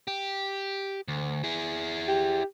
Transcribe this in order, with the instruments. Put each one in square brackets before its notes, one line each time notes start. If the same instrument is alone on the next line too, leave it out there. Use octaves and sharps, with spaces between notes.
[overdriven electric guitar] G4
D2
E4 G#4
[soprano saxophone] G4